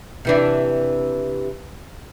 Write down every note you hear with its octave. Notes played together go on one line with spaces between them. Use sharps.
C3 E3 D4